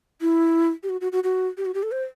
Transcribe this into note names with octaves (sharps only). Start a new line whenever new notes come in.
E4
G4
F#4
F#4
F#4
F#4
G4
F#4
G4
A4
C5